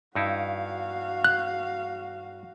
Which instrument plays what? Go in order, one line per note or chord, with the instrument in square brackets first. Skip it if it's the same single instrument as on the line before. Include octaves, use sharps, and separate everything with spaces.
[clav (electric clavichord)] G2 D#4 E4 [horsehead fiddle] F#4 F5
[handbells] F#6